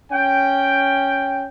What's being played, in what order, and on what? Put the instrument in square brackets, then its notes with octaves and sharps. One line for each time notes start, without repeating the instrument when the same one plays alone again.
[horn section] C#4 G5